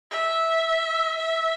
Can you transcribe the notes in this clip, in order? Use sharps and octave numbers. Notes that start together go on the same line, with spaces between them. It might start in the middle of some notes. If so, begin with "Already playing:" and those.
E5
E5